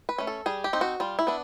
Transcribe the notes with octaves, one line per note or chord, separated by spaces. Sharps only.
B4
A3 C#4
A4
G3 G#4
G4
C4 D#4
F#4
G3 F4
E4
B3 D4